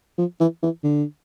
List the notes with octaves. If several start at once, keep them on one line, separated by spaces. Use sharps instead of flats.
F3
E3
E3
D3